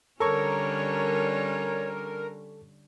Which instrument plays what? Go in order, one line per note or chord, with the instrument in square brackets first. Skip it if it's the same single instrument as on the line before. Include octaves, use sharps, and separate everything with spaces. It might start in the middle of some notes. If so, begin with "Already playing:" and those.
[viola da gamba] D3 G3 C#4 [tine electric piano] A4 C#6 [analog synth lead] A#4 [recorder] C#5